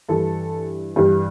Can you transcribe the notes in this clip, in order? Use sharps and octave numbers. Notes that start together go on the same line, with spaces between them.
G2 E3 G3 A4
G2 E3 G3